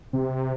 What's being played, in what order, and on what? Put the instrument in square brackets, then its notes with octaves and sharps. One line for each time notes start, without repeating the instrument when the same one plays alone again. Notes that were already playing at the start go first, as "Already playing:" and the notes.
[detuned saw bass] C3